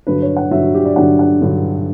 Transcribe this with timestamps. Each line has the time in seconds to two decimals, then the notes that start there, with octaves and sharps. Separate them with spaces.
0.07 G2 D3 F#3 B4
0.22 C#5
0.37 F#5
0.51 G2 D3 F#3 E5
0.63 F#4
0.75 G4
0.85 D5
0.96 G2 D3 F#3 F#5
1.19 F#5
1.42 G2 D3 F#3